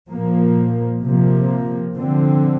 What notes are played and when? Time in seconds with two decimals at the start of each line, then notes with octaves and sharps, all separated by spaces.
0.12 A#2 F3 A#3
1.04 C3 F3 A#3
1.96 D3 F3 C4